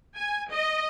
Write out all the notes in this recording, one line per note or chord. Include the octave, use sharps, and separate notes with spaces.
G#5
D#5